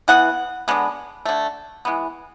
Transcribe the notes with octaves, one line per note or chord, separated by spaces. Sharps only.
E3 B3 F#5
D3 G#3 B3
D3 A3
E3 G#3 B3